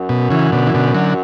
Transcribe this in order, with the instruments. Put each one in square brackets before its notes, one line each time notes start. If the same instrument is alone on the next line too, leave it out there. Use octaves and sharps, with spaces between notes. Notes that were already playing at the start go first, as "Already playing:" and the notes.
Already playing: [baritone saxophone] F#2
[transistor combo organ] B2
C#3 E3
B2 D3
E3
B2 D3
D3 F#3